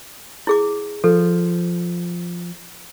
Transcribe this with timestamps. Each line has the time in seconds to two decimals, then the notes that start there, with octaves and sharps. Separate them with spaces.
0.47 E4 G#4 D6
1.04 F3 A4